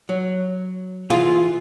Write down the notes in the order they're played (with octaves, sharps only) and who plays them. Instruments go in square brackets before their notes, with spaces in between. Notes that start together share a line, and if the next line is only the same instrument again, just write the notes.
[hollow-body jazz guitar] F#3
[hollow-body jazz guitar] E3 G#4 [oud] F4